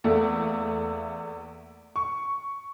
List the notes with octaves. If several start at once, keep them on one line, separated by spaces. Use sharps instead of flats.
E2 A3 A#3
C#6